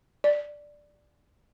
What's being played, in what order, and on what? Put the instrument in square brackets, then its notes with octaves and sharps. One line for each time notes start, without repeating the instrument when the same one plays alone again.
[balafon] D5